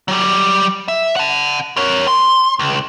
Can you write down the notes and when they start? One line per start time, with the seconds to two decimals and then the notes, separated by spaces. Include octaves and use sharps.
0.08 F#3 G3
0.88 E5
1.16 F#5 A5
1.77 A#4 C#5
2.08 C6
2.59 C#2